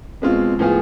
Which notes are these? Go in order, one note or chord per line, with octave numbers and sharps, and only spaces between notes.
B2 G#3 C4 F4
A2 F3 B3 F4 G#4